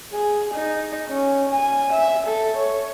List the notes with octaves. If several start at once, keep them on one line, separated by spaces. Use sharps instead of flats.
G#4
D#4
C#4
G#5
E5
A4
C#5